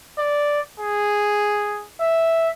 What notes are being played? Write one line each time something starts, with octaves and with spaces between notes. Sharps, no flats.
D5
G#4
E5